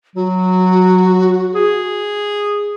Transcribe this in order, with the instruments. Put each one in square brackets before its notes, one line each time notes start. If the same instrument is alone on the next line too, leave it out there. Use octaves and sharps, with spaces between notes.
[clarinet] F#3 [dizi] F#4
[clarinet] G#4